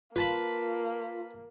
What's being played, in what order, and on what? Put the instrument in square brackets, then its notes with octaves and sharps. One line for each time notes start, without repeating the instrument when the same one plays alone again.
[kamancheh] A#3 [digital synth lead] F4 [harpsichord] B4 A5 B5